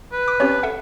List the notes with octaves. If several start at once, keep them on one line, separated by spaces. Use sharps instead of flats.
B4
D6
C4 C#4 G4 C#5
A4 E5 F#5